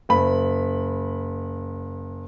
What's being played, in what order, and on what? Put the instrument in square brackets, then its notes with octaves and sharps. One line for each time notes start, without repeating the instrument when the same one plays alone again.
[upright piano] F#1 B5